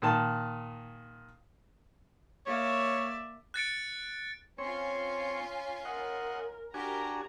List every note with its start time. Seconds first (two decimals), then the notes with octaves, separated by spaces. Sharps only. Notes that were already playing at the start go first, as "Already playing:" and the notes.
0.02 A#2 D#3 A5
2.47 A#3 C#5 D5 E5
3.54 F#6 A6 C#7 D7
4.58 C4 C#4 F4 C#5 G#5
5.85 A#4 D#5 F#5
6.74 D4 F#4 G4 A#4 G#5 A#5